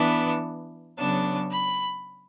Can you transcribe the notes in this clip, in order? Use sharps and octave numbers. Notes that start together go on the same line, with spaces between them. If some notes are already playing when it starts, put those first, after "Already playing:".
Already playing: E3 B3 D4
C#3 F#3 B3 D4 A5
B5